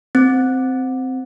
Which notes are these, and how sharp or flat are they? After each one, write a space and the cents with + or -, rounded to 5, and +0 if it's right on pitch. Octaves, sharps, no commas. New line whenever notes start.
C4 -10